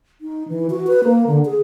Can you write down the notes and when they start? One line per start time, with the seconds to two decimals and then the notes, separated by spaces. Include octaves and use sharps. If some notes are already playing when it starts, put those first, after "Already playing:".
0.21 D#4
0.48 E3
0.70 F#4
0.87 B4
1.04 A#3
1.27 D3
1.45 G#4